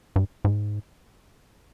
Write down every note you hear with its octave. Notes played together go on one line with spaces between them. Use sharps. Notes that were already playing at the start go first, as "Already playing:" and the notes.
G2
G#2